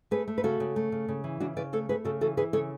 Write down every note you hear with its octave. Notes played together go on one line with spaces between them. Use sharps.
A3 G#4 B4
A3
B4
C#3 F#4 A4
C#3
A3
C#3
C#3
E3
C#3 D4 F#4
C#3 B4 D5
A3 A4 C#5
A3 G#4 B4
C#3 F#4 A4
E3 F#4 A4
E3 G#4 B4
C#3 A4 C#5